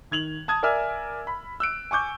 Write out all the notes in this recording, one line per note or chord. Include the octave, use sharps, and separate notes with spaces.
D#3 G#6 F7 F#7
A5 D#6 G#6
A#4 D5 E5 G#5 E6 F6
B5
E6 F#6 D7
G#5 C#6 D6 G6